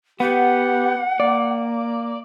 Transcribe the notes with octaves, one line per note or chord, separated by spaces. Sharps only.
B3 G4 F#5
A#3 D5